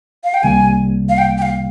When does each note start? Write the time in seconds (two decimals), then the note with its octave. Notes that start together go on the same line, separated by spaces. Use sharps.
0.24 F5
0.34 G5
0.43 C2 C3 D#3 G3 A#3 G#5
1.09 F5
1.18 G5
1.38 G5
1.42 F5